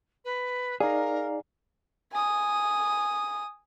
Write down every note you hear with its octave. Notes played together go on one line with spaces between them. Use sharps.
B4
D#4 G#4 A#4 D5 F5 A#5
G#5 D#6